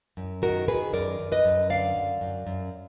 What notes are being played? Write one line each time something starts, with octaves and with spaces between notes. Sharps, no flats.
F#2
D#3 F#4 A#4
D#3 G#4 B4
F#2 A#4 D5
F#2
B4 D#5
F#2
D3 D5 F5
F#2
F#2
F#2